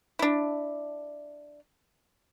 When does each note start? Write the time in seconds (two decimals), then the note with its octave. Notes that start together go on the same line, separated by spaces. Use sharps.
0.19 D4 E4